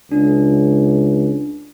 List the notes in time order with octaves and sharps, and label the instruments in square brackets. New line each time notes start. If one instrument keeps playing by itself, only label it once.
[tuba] C#2 [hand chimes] D4